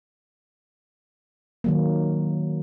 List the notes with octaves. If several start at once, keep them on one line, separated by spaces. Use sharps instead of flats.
D#3 F#3 A#3